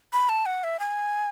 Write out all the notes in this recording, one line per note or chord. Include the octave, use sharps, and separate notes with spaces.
B5
A5
F#5
E5
G#5